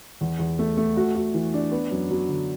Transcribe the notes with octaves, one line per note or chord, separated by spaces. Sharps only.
E2
E2
A3
A3
F#4
F#4
E3
D4
B3
F#2
F#3
D3